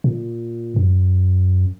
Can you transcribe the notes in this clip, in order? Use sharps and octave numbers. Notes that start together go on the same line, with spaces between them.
A#2
F#2